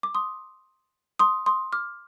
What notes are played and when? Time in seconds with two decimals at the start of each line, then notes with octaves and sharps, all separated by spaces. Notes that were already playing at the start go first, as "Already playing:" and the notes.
0.03 D6
0.15 C6 D#6
1.19 C6 D#6
1.46 C6 D#6
1.73 D6 F6